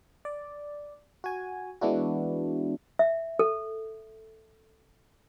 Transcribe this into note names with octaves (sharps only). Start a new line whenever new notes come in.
D5
F#4 G#5
E3 G#3 B3 D4 E4 F#4
E5
A4